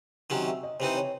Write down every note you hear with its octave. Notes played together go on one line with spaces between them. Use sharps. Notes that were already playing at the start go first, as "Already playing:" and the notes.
C3 D#3 F#3 C#4
E5
D#5
C3 E3 C4 D#4 C5
C#5